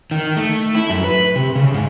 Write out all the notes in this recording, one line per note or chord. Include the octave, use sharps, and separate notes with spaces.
D#3
A3
E4
F#2
B4
C3
C#3
G#2